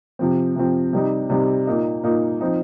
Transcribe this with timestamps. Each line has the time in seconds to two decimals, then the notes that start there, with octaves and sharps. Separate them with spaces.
0.19 C3 F3 C4
0.56 C3 F3 C4
0.93 C3 G3 D#4
1.30 C3 G3 D#4
1.67 A#2 A#3 D#4
2.03 A#2 A#3 D#4
2.41 F3 C4 D#4